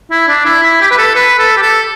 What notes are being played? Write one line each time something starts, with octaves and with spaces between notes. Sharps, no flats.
E4
D4
E4
E4
G4
B4
A4
B4
A4
G4
A4